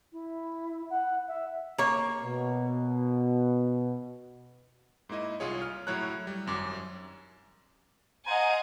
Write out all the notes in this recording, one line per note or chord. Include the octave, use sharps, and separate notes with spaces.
E4
F#5
E5
A#3 C#5
B2
G#2 A#3 E4 D#5
C2 F4 G#4 C#5
F6
A2 F#3 E4 C#5 A#5 F#6
G3
G#1 F#2 D6
C5 D#5 F5 F#5 G#5 A#5